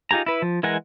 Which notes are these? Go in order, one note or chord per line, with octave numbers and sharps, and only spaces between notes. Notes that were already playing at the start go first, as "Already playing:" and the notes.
D#4 F4 G4 G#4 A#5
E4 B4
F3
E3 G#3 A#4 F#5 G#5